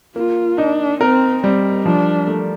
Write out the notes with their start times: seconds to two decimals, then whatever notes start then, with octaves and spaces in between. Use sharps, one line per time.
0.16 A#3 F4
0.58 D4 D#4
1.01 C4 A#4
1.43 G3 C4
1.85 F3 D4
2.27 A3